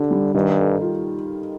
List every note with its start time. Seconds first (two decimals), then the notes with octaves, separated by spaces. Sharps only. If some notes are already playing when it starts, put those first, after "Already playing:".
Already playing: D3 D4 G4
0.11 G3
0.34 G2 D#3
0.58 A4
0.81 F4